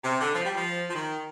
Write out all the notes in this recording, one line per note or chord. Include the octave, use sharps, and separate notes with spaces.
C3
D3
F3
G3
F3
F3
D#3